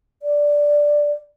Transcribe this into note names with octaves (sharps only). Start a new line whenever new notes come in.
D5